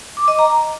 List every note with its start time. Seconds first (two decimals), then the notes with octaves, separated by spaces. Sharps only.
0.17 D6
0.28 D#5
0.39 A#5